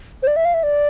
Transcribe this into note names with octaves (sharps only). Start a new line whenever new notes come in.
C5
D5
E5
F5
E5
D5